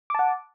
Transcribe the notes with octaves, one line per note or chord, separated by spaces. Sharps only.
F#5 A5 D6